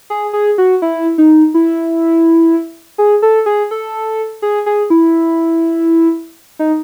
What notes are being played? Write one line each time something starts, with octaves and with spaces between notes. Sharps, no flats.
G#4
G#4
F#4
E4
D#4
E4
G#4
A4
G#4
A4
G#4
G#4
E4
D#4